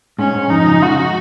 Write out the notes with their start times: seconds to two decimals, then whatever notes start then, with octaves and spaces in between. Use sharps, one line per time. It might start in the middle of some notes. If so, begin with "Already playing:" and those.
0.18 G#2 C#4
0.35 G#2
0.50 F2 D#4
0.66 C#3
0.81 G#2 F#4